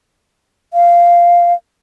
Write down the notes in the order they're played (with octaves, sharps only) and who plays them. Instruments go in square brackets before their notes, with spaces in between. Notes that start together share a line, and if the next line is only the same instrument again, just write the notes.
[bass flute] F5